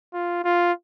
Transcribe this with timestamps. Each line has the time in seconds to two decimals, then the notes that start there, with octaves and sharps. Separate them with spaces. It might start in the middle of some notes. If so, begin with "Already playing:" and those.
0.14 F4
0.44 F4